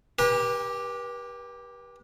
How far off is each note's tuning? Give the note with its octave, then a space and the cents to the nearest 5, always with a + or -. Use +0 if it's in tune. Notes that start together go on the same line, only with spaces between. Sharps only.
G4 +0 B4 -40 G5 +45